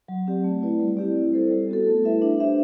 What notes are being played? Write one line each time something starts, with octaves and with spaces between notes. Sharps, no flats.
F#3
C4 G4 D5
A3
E4 B4 D5
G3
C4 E4 G4 D5
E4
A4 C5
G3
B3 F#4 A4
A3
E4 B4 E5
D4
G4 C5 E5